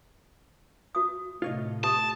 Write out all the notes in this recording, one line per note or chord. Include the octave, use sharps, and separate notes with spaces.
F#4 D#6
A2 C3 A3 F4 C#5 D#5
G4 A5 D#6